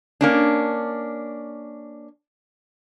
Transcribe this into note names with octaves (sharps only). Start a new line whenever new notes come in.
A#3 C#4 D4